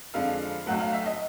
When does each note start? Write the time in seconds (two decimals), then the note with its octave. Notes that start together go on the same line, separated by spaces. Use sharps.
0.14 F2 D3 F3 G#3 F5
0.66 B1 A2 F#3 A3 F#5
0.80 F5
0.93 E5
1.06 D#5